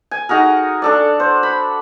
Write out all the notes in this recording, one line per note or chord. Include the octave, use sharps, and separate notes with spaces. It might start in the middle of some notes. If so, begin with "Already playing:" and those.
G#5
D#4 F#4 G#4 A#4
D4 A4 D5
C5
B5